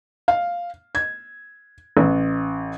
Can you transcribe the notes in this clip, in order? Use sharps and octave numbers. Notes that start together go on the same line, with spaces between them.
F5
G#6
A1